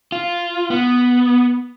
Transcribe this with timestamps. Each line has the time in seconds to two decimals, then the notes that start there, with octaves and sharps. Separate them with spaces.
0.12 F4
0.70 B3